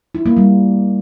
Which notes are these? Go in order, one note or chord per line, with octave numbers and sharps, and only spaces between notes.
E4
A#3
G3